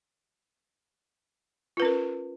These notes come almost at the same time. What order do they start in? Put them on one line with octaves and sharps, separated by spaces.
F4 B4 C#4 A#4